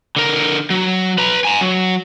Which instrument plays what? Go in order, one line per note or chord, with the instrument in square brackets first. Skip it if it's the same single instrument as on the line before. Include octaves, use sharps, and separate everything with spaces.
[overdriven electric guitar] D3 A#4
F#3
B4 A#5
G#5 A#5
F#3